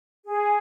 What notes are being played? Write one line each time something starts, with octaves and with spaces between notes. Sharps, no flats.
G#4